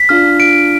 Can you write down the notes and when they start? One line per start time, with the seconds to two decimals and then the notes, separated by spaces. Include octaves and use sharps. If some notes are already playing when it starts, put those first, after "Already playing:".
Already playing: B6
0.09 D4 F4 F6
0.40 D7